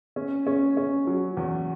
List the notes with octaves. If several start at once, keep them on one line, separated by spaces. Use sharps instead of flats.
C#4
C#4
C#4
F#3
E2